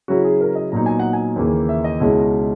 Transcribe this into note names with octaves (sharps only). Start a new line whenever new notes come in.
C#3 F#3 C#4 E4 F#4
G#4
A#4
D#5
A#2 F#3 B3 D#4 A#5
G#5
F#5
G#5
D#2 C#3 E3 A#3
E5
D#5
C#2 B2 G#3 C#4 E4